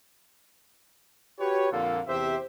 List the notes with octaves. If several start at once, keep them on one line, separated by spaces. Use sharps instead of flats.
F#4 G4 B4 C#5
F2 A#2 D3 A#3 F4 A4
E2 C3 G4 C5 E5